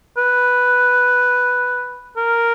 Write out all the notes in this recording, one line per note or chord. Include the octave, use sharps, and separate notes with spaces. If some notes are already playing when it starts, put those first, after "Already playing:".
B4
A#4